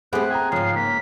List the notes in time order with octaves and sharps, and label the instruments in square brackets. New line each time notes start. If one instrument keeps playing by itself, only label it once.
[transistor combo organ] G3 B3 [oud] A3 C4 [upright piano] G#4 F#5 [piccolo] F#6
[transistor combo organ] G#4 [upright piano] G5 A#5
[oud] G#2 C#3 [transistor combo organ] F3 [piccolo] C7
[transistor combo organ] A#3 [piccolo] B6